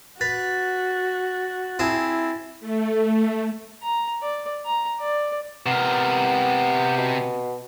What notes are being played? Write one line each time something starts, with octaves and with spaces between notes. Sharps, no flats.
F#4 B4 A6
C4 E4 G#4 A5
A3
A#5
D5
A#5
D5
C3 B3 A#4
B2